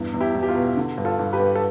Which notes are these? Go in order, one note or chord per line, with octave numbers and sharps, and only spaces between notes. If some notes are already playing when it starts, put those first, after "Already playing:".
Already playing: E2 G2
E2
E4 G4
E2
G4
F4
B2
D3
G2
F4 A4
G2
G4 B4
G2
A4